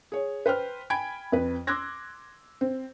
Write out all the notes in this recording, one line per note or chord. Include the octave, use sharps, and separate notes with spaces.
G#4 C#5
B4 C5 G5 F6
G5 G#5 B5 G#6 D7
F2 B4
C6 D6 E6 F#6 G#6 A#6
C4